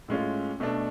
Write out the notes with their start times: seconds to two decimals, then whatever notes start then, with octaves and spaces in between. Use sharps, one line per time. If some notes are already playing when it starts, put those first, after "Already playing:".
0.08 A2 G#3 C#4 F4
0.60 B2 A3 D4